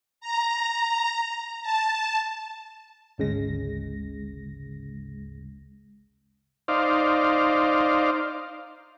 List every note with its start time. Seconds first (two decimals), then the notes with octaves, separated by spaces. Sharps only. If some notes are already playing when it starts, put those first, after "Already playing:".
0.21 A#5
1.62 A5
3.18 G#1 D2 C#3 G#3 A#6
6.68 D#4 C5 D5 F5